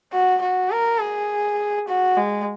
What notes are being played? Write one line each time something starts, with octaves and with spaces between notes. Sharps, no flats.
F#4
F#4
A#4
G#4
F#4
G#3